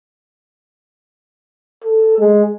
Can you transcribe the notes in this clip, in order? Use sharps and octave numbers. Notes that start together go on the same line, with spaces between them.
A4
G#3